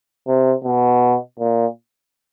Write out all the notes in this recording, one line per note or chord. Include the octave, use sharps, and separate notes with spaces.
C3
B2
A#2